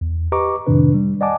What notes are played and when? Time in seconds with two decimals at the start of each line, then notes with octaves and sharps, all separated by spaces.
0.01 E2
0.32 G4 B4 D#5 A#5 C#6 D6
0.67 F2 A2 C3 D#3 D4 B4
0.94 G3
1.21 D5 D#5 F#5 G#5 A5 D6